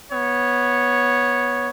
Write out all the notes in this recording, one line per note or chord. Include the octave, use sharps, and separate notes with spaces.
B3 C#5